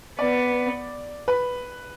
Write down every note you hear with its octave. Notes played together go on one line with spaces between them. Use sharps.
B3 D5
B4